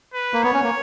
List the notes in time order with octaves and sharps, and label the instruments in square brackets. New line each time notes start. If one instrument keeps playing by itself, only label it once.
[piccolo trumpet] B4
[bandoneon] A#3
[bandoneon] B3 [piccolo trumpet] C#5
[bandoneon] C#4
A#3